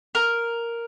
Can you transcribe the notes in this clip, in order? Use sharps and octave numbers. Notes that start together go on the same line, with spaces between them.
A#4